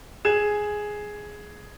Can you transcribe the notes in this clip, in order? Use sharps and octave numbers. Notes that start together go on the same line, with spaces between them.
G#4 G#6 E7